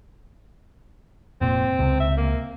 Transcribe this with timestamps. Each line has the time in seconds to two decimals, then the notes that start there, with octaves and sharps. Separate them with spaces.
1.41 F1 A#2 C4
1.79 C#2 C3
2.00 E5
2.17 A#3